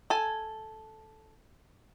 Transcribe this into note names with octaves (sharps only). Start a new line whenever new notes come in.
A4 G#5